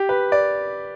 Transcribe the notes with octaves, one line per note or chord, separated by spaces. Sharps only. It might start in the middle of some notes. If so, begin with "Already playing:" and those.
Already playing: G4
B4
D5